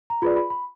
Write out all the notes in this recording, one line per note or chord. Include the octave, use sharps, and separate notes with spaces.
A#5
F4 G#4 B4 D5 B5
B5
B5